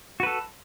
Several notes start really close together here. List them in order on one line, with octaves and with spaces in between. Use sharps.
F#4 B4 A4